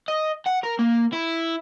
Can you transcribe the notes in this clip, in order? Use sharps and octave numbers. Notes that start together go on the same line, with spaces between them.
D#5
F#5
A#4
A#3
E4